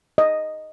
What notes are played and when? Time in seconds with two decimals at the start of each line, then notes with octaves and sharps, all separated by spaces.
0.18 D#5